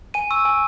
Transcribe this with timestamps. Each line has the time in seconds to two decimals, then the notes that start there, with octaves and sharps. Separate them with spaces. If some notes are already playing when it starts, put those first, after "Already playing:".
0.14 G#5 D#7
0.31 C#6 E6
0.45 G#5